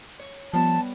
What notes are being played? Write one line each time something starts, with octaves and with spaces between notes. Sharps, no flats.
C#5
F3 G3 B3 A5